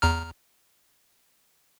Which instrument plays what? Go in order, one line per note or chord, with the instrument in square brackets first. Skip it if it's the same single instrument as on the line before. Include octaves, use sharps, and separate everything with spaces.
[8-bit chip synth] E2 A#5 F6